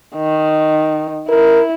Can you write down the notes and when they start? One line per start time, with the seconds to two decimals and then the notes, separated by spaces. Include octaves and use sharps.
0.16 D#3
1.29 E4 A#4